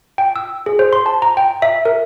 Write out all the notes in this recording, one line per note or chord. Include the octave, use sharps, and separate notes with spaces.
G5
E6
G#4
C5
C6
A5
A#5
G5
E5
A#4